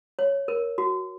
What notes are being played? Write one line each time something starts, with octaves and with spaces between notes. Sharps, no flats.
C#5
A#4
F#4